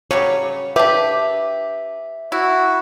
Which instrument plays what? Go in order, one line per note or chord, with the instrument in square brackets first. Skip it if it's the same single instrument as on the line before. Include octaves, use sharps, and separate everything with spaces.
[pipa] C#3 F#3 G3 [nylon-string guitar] C#5
[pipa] D4 G4 [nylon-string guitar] B4 [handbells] E5
[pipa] E4 [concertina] F#4